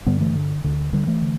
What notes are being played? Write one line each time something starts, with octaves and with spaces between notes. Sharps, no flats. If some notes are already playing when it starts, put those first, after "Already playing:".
G2 D3 G3 B3
E3 A3
D3
D2 D3
D3 G3
E3 A3
D3